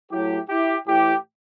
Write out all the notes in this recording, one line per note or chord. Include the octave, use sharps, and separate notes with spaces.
A2 F#3 E4 G4
E4 G4
A2 E3 E4 G4